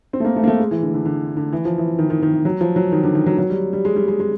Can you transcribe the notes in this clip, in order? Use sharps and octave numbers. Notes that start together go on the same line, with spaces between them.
C4
A3
A#3
A3
A#3
A3
G#3
E3
D3
D3
D3
D3
E3
F3
E3
D#3
D#3
D#3
F#3
F3
F#3
D#3
D3
D#3
F#3
F#3
G3
G3
G#3
G3
G#3
G#3